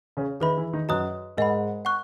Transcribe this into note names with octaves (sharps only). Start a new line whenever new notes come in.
C#3 C#4
D#3 D#4 G#4 B4 E5 B5
E3 E4
D#3 D#4
F#2 F#3 B4 D#5 A#5 D#6 F#6
G#2 G#3 A#4 D#5 F#5 B5
F#5 C#6 F#6